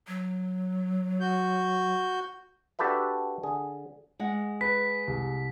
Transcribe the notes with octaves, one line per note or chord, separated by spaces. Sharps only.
F#3
F#4 G6
D4 F#4 G4 A4 B4 E5
D3 G#4
G#3 F#5
B4 B6
C2